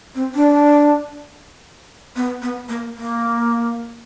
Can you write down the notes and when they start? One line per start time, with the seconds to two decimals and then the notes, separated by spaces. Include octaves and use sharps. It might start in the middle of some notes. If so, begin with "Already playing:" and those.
0.15 C4
0.35 D4
2.16 B3
2.42 B3
2.69 A#3
2.97 A#3